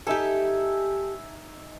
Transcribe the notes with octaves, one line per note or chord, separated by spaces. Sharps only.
D#4 G4 A4 E5 G#5